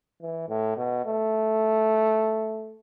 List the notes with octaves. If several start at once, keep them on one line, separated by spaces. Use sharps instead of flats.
E3
A2
B2
A3